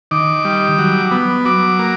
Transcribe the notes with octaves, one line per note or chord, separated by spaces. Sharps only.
D#3 D6
G3
F#3
B3
F#3 D6
A#3